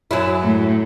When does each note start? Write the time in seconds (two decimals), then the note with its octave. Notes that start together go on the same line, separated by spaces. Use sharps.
0.11 F#2 F#3 E4
0.42 A2